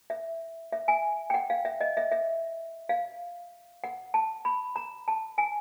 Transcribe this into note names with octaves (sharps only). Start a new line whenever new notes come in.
E5
E5
G#5
G5
F#5
F5
E5
D#5
E5
E5
F5
F#5
A5
B5
A#5
A5
G#5